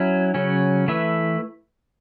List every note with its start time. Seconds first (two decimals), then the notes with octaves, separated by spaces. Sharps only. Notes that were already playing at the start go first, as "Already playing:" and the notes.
Already playing: F#3 C#4 E4
0.35 C#3 F#3 C#4
0.88 E3 A3 E4 B4 E5